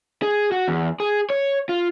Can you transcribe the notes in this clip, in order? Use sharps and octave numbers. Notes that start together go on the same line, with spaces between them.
G#4
F#4
E2
G#4
C#5
F4